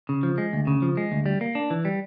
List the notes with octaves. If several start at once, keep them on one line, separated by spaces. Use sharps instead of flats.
C#3
F3
G#3
D2
C#3
F3
G#3
D2
G3
A#3
D4
E3
G3